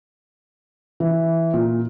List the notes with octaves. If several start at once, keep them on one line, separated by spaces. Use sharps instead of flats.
E3
A#2